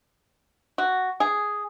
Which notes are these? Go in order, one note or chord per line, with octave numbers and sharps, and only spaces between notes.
F#4
G#4